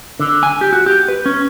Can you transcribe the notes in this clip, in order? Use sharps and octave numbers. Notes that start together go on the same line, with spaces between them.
D3
G#5
G4
F#4
G4
B4
C#4